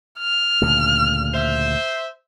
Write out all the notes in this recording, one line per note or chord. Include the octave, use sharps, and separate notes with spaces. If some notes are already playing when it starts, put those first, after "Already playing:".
F6
D2 A#2 C#3
C5 E5